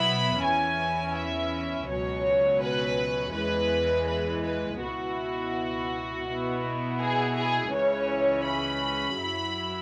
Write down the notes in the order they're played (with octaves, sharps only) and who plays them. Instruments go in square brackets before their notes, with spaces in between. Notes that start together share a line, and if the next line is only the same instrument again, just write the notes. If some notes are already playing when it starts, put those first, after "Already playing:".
Already playing: [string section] B2 F#3 B3 E4 B5
E2 E3 C#4 E4 G#5
E5
C#2 B2 F#3 C#4 C#5
B4
E2 E3 G#3 B4
B4
B4
C#2 B2 B3 E4 F#4
B2 B3 E4
G#4
G#4
C#2 C#3 E3 C#4 C#5
B5
F#2 F#3 E4